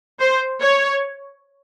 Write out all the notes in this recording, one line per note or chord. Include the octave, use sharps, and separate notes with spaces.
C5
C#5